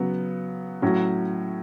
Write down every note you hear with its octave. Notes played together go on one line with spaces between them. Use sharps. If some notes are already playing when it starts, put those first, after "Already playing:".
Already playing: C#3 F#3 B3
A2 F#3 C#4